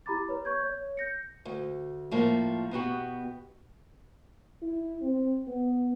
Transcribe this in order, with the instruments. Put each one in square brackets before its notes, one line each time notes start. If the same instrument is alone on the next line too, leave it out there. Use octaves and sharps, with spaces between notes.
[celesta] E4 G4 A#5 B5 D6 A6
B4 C#5
C#6 G6 G#6
C#5
G6 A#6 C#7
[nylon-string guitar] D2
A2 F3 A#3
B2 B3 F#4 G4
[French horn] E4
C4
B3